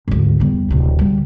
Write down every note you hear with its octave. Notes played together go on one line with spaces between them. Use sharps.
G#1 D2
E2 G3
D1 C3
D3 G3